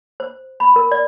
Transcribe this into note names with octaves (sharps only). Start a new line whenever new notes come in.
C5
B5
A#4
D5